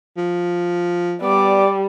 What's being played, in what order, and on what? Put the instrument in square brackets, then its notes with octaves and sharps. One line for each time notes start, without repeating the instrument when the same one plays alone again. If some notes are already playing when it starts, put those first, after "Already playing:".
[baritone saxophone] F3
[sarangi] G3 [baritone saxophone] B3 [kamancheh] D5 D6